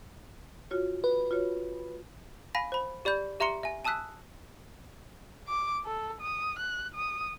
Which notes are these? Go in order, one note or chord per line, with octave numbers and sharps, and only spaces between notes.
F4 F#4 C#5
B4
F4 F#4 C#5
F5 G#5 B5 A#6
C5 B5
G4 D5 B5 G6
G4 E5 A#5 C6 C#7 G7
E5 G#5
G#5 A5 D#6 E6 F#6 B6
D6
A4
D#6
F#6
D#6